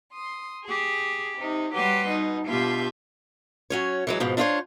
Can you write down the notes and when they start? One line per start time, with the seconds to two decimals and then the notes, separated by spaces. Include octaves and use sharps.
0.13 C6 D#6
0.64 G4 G#4
1.37 C3 D#4
1.73 F#3 G3 G4 B4 F#5 C6
2.07 B2 D#4
2.46 G2 B2 F4 G4 E5 G6
3.70 F#3 C#4 C#5
4.07 E3 F#3 G#3
4.20 G#2 B2 F3
4.37 D4 E4 F4 G4 C5 C#5